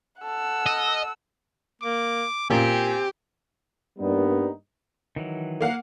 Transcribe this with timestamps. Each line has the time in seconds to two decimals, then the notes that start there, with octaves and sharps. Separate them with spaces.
0.22 A4 F#5 E6
0.66 D#5
1.82 A#3 D6
2.51 A#2 C4 G4 G#5
3.99 G2 G3 A#3 B3 D#4
5.16 D#3 E3 F#3
5.61 A#3 F5 F#5